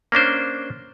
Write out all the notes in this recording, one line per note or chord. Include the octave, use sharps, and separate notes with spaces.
A#3 C#4 D4 C5